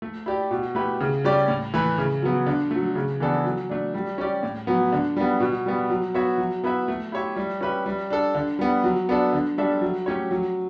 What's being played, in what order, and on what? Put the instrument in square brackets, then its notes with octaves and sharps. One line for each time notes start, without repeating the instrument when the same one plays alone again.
[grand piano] A3
E4 G4 D5
B2
A3 E4 G4 B4
C#3
G3 C#4 G4 D5
A2
E3 A3 E4 B4
C#3
F#3 B3
D3
F#3 A3
C#3
E3 B3 D4 A4
F#3
A3 D4
G3
C#4 G4 D5
A2
F#3 B3
D3
G3 B3
B2
G3 B3
F#3
B3 F#4 C#5 E5
F#3
B3 E4 B4 E5
A3
E4 G4 C#5 E5
G3
C#4 G4 B4 E5
G3
D4 A4
D3
G3 B3
F#3
B3 D4 A4
D3
G3 D4 A4 E5
F#3
A3 C#4 G4 C#5
F#3